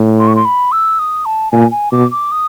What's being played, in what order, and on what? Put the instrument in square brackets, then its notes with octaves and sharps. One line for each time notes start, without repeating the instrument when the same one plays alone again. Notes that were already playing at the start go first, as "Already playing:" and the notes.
Already playing: [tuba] A2
[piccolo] C6
C#6
C6
B5
E6
D#6
A5
[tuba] A#2 [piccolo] G#5
[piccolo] G#5
[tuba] B2 [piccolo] D6
[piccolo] D6
D#6